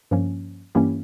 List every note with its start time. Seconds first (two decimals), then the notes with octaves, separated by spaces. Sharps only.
0.11 G2 F3 A#3 C#4
0.75 G2 E3 A#3 C#4 E4 G4